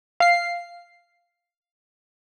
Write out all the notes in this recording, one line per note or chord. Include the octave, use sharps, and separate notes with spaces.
F5 C7